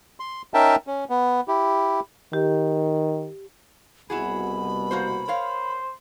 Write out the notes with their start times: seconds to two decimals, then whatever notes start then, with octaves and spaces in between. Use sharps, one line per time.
0.20 C6
0.54 C#4 D#4 A#4 E5 G5 A5
0.87 C#4
1.10 B3
1.48 E4 G4
2.33 D#3 G4
4.10 C2 B2 E4 F#4 G#4 B5
4.91 A#3 F#4 C5
5.28 A#4 C5 C#5 F5